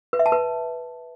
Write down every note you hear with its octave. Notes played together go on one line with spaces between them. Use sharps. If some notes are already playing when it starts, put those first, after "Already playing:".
B4
E5
A5
B4